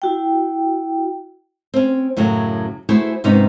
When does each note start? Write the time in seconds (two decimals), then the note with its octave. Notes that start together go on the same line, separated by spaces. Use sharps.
0.02 E4 F#4 G5
1.74 C4 C#4
2.17 F#2 A2 C#3 F#3
2.89 A3 E4 F#4 G#4 C5 C#5
3.24 G#2 C3 B3 C#4 D#4